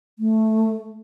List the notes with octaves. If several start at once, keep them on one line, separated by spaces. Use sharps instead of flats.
A3